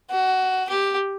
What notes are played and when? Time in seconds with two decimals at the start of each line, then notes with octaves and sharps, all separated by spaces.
0.11 F#4
0.69 G4